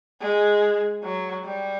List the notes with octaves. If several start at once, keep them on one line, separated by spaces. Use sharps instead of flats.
G#3
F#3
G3